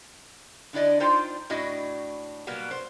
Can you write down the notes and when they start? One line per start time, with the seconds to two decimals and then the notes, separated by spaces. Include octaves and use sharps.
0.73 D3 D4 E4 D5 D#5
1.00 D4 D#4 F4 C5 G5
1.50 A2 D4 E4 F#4 D#5
2.47 B2 F#3 G3 A#3 B3
2.71 C5